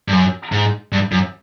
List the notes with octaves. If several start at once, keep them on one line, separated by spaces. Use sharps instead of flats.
G2
F#2
G#2
G2
F#2